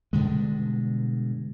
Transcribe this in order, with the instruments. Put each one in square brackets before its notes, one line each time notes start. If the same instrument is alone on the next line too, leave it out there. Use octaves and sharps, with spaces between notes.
[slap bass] G2 B2 D3 G#3